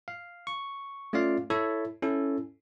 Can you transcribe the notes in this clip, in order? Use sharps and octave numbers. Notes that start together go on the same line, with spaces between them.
F5
C#6
A3 C#4 F4 D5 F5
E4 A4 C#5 E5
C#4 E4 A4